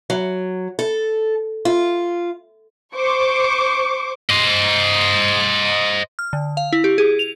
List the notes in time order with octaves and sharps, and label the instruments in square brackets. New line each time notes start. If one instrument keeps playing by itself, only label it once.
[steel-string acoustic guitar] F#3
A4
F4
[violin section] C5 C#6 D6
[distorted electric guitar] C5 D#5
[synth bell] F6
D3
F5
E4
G4
G#4
F7